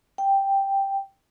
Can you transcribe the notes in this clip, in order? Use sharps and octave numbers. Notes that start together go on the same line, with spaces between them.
G5